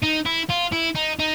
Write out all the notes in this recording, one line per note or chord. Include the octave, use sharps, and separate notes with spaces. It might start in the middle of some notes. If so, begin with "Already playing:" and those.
D#4
E4
F4
E4
D#4
D#4